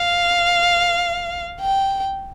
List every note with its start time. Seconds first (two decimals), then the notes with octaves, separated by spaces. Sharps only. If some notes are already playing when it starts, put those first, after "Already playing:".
Already playing: F5
1.60 G5